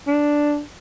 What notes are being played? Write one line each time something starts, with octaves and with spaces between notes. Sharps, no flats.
D4